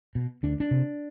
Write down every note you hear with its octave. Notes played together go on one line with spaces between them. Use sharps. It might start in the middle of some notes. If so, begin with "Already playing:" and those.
B2
D2 D4
D4
C3